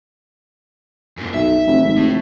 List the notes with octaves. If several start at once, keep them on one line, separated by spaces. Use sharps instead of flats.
F#2 A#2
B1 E5
F1
G#1
F1 A2